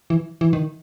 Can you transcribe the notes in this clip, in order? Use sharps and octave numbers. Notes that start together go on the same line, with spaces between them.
E3
E3
D#3